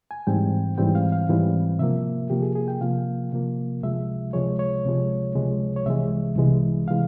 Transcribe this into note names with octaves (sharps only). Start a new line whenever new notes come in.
G#5
G#2 E3 G3 C4 G5
G#2 E3 G3 C4 G5
F5
F5
G#2 E3 G3 C4
C3 F3 A#3 E5
C3 F3 A#3 G4
G#4
G#4
G5
C3 F3 A#3 F5
C3 F3 A#3
C#2 C3 F3 G#3 E5
C#2 C3 F3 G#3 C#5
C#5
C#2 C3 F3 G#3
C#2 C3 F3 G#3
C#5
C2 C3 E3 G#3 E5
C2 C3 E3 G#3
C3 E3 G#3 F5